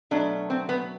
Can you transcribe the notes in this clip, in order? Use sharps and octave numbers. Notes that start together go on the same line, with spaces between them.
B2 F#3 A3 D4
C4
B3